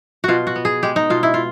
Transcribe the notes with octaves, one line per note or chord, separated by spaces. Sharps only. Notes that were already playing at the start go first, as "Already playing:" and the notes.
B2 F4 F#4
F#4
B3
G#4
G#3 G4
D#4
B2 F4
E4
F4